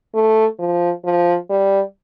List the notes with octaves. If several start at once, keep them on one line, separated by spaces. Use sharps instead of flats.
A3
F3
F3
G3